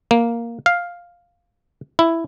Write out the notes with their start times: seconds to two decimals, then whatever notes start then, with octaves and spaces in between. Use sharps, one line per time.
0.11 A#3
0.66 F5
1.99 E4